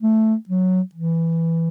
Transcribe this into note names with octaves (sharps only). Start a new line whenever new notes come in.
A3
F#3
E3